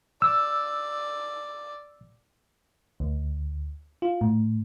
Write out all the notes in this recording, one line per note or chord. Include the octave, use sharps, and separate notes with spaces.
D5 E6
D2
F4
A2